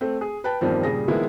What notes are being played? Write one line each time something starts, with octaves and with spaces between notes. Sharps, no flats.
A3 C4
G#4
B4 G5 A5
E2 G2 D#3 F3 A#3 C4
A#2 C#3 G3 G#4 A#6
D#3 F3 G#3 A#3 B3 E4